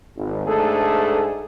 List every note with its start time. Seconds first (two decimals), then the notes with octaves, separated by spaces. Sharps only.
0.16 G#1
0.46 D2 G#2 A3 D4 G#4 A4